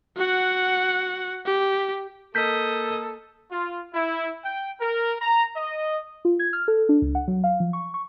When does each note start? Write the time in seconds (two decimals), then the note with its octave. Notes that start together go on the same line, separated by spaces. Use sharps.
0.17 F#4 F#5
1.46 G4
2.35 A#3 A4 D#5 G6 B6
3.51 F4
3.93 E4
4.44 G5
4.81 A#4
5.22 A#5
5.56 D#5
6.25 F4
6.39 G#6
6.53 F6
6.68 A4
6.89 D4
7.02 C#2
7.15 F#5
7.28 F#3
7.44 F5
7.60 F3
7.73 C#6
7.94 C#6